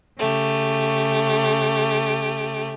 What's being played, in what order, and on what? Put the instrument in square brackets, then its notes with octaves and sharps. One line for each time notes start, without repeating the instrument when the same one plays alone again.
[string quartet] C#3 A3 G4